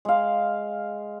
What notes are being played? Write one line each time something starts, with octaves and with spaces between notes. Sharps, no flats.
G#3 F5